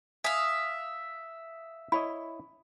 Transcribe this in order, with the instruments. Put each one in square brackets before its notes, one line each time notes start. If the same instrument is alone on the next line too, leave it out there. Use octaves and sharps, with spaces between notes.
[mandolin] E5 F5 [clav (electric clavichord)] G#5 [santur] D#6
[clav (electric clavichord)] E4 C#5 D#5 [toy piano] B5